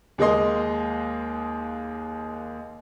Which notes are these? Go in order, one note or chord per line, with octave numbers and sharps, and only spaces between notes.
D#2 G#3 A#3 D#5 C6